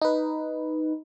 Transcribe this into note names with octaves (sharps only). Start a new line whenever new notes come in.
D#4 B4